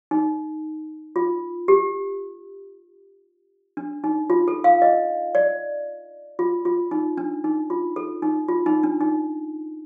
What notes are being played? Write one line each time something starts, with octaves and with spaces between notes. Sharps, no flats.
D#4
F4
G4
D4
D#4
F4
A4
F5
D#5
D5
F4
F4
D#4
D4
D#4
F4
A4
D#4
F4
D#4
D4
D#4